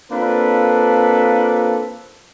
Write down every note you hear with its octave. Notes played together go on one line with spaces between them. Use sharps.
A#3 C4 D4 F4 A4 B4